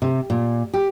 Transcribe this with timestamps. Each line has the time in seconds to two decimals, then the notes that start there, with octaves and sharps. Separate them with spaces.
0.02 C3
0.30 A#2
0.74 G4